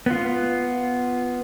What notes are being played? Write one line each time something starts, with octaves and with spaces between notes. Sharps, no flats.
B3 F4